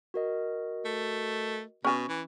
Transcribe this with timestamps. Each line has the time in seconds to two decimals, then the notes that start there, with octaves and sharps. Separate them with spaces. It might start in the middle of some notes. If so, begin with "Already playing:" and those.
0.14 F#4 A#4 D#5
0.85 A3
1.84 B2 C#4 G#5
2.09 E3